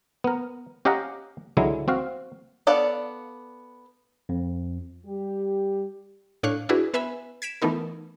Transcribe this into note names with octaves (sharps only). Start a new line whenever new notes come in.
B3 A#4
C#4 G4 D#5 F5 F#5 A#5
C#2 D3 F#3 G#3 E4
C4 F#4 F5
B3 A4 D5 F5 F#5
F2
G3 G4
A2 D4 C#5 F5 C#6 F#6
D4 E4 F#4 G#4 B4
B3 B4 E5 G#5 B5
G#6 B6 D7 E7
E3 A3 B3 D#4 A#4